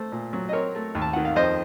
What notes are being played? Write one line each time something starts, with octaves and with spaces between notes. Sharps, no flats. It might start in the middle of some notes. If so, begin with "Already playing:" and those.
Already playing: A3 C5
A#2
F#3
D#5
C4 A#4 C#5
A3
D#2
A5
D#3 F#5
F5
F2 C5 D#5